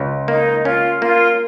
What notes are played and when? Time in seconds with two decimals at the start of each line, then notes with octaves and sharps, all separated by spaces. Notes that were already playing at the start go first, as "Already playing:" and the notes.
Already playing: C#2
0.28 A#3 D#4
0.64 C#4 F4
1.01 A#3 F4